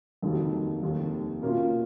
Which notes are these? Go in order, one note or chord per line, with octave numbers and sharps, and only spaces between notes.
F1 D#2 D#3 F#3
F1 D#2 D#3
B2 A#3 C#4 F4